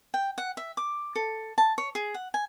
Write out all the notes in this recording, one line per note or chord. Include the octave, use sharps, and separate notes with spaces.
G5
F#5
E5
D6
A4
A5
C#5
G#4
F#5
G#5